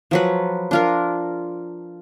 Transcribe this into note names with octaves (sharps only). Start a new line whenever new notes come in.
F3 F#3 B4
D4 F4 A#4